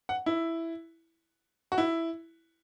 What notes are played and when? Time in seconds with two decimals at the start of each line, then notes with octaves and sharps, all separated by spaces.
0.09 F#5
0.26 E4
1.72 F#4
1.78 E4